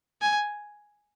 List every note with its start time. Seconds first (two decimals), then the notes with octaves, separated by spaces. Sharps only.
0.22 G#5